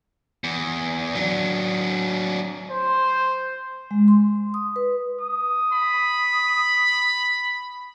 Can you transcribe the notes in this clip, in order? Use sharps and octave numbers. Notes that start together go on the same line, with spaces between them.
E2
F#3 D4
C5
G#3
C6
D#6
B4
D#6
B5